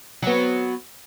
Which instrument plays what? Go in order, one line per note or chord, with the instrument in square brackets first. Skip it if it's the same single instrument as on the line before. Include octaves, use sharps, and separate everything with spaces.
[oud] F#3 B3